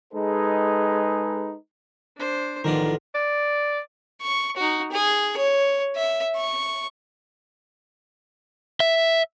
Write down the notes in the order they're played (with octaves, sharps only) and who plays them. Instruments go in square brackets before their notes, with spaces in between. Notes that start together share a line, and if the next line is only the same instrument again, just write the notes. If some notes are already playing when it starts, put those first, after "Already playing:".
[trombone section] G#3 D#4 G#4 A4 B4
[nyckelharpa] D4 C5
[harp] A1 F3 [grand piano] D#3 [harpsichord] B3 D4 A#4 [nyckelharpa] F4
[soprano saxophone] D5
[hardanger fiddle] C#6
D#4 F#4
G#4
C#5
E5
C#6
[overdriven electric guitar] E5